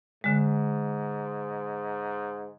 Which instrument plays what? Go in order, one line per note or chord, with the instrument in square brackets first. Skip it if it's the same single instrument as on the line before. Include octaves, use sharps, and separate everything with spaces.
[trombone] G#2 [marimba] D3 G#3